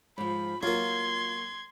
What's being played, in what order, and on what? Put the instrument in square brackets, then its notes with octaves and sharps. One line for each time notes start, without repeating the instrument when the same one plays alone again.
[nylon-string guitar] G#2 F3 [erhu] B5
[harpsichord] F#3 A#3 [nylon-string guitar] F4 [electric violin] C6 [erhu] G#6